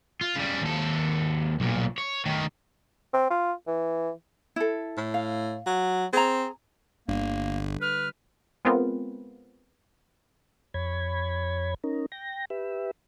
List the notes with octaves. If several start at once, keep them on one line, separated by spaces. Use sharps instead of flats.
F4
C#3 G3
D#2 A4
B1 A#2
C#5
D#3 A3
C4
F4
E3
E4 A4
A2
F5
F#3
C4 G#4 A#5
G1 D3 G3 A#3 D4
B4 F6
G#3 B3 C4 F4 A#4
F2 C#5 B5 G#6
C#4 D#4 A#4
G5 A#6
G4 B4 E5